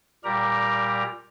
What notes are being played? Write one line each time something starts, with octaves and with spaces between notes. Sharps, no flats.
A#2 G3 G4 A#4 A#5